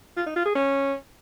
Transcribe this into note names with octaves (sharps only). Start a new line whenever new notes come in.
F4
D#4
F4
G#4
C#4